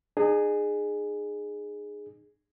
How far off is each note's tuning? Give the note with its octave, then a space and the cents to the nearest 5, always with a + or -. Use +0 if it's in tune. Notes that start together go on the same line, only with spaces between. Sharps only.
D#4 -45 G#4 +0